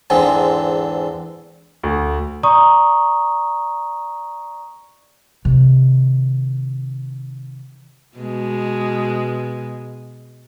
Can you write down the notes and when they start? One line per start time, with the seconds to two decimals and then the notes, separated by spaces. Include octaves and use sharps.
0.10 E2 G#2 D3 G#3 C4
1.83 D2
2.43 D5 A#5 C#6 D#6
5.45 C3 D#3
8.17 B2 G#3